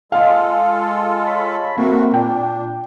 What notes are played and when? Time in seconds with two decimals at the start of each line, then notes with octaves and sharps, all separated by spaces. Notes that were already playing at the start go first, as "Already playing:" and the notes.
0.12 G#3 F4 A4 D#5 F5
1.26 C#5 A5 B5
1.77 F#3 A3 A#3 C4 F#4
2.14 A#2 D4 G5